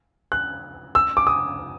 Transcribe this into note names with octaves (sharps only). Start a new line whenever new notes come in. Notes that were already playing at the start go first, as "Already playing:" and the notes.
F#6
E6
D6
D#6